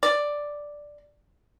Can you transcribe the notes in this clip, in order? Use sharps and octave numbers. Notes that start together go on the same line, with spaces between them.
D5